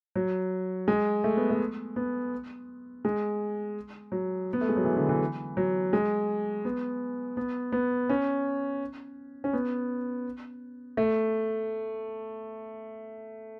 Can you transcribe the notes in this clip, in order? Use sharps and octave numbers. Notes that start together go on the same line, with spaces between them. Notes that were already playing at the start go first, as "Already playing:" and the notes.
F#3
G#3
A3
B3
A3
B3
G#3
F#3
B3
A3
G#3
F#3
E3
D3
E3
F#3
G#3
B3
B3
B3
C#4
C#4
B3
A3